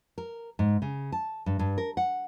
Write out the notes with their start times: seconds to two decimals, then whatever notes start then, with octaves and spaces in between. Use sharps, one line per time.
0.18 A#4
0.59 G#2
0.82 C#3
1.12 A5
1.46 G2
1.59 G2
1.78 A#4
1.97 F#5